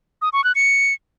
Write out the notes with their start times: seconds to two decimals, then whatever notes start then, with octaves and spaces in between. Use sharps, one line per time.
0.22 D#6
0.33 C#6
0.44 F#6
0.55 C#7